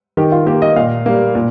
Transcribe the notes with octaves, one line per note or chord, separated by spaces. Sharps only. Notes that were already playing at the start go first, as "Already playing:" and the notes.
D#3 G4
F4
A#3 G4
D#5
A#2 F5
G3 A#3
A#2